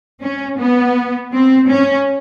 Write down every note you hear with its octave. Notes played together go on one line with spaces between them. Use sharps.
C#4
B3
C4
C#4